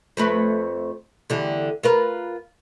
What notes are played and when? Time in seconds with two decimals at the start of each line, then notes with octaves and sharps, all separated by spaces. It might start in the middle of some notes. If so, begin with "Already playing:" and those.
0.17 F2 A3 B4
1.30 E2 D3 G3
1.83 F4 A#4 B4